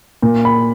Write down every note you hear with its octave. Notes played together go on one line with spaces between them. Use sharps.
A#2
B5